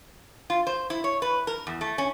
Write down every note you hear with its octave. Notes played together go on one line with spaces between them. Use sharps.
F4
C5
E4
C#5
B4
A#4
E2
A3
C#4